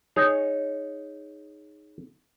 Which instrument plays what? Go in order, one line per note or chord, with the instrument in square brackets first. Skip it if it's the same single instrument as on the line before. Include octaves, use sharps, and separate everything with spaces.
[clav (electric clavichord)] D#4 G#4 C#5